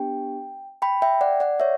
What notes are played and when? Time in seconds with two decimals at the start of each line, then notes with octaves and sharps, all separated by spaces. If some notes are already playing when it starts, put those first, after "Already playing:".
Already playing: B3 D4 G4 G5
0.82 G5 B5
1.02 E5 G5
1.21 D5 F#5
1.40 D5 F#5
1.60 C#5 E5